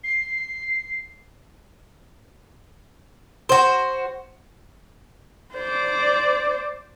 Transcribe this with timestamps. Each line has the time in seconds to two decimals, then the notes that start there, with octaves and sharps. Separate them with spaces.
0.03 C7
3.49 F#4 C5
5.54 C5 D5